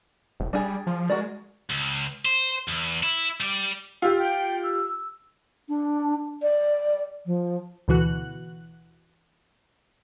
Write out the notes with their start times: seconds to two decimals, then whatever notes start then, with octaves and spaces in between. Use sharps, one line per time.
0.40 E1
0.53 G3 D4 G#4
0.87 F3
1.10 G#3 F#4 A#4 D5
1.70 C#2
2.25 C5
2.68 E2
3.03 E4
3.40 G3 D5
4.02 F4 G4 E6
4.18 G5
4.63 E6
5.69 D4
6.42 D5
7.26 F3
7.88 D2 B2 E3 F#4 F#6